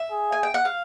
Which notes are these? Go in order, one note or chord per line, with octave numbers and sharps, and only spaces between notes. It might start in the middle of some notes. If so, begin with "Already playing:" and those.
Already playing: E5
G#4
G#5
G5
F#5
F5